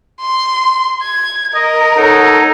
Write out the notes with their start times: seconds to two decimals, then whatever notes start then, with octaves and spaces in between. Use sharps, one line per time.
0.21 C6
1.02 G#6
1.54 A#4 D#5
1.97 D#4 A4 C#5 F#5